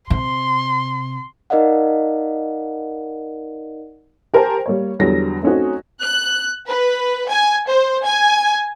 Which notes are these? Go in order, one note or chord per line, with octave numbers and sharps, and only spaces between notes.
C3 C6
D#4 A#4 D5 D#5 F5 F#5
G4 A#4 C5 G#5 A5
G3 A#3 C#5
E2 D3 F#3 G3 A#6
A3 C4 C#4 D#4 F#4
F#6
B4
G#5
C5
G#5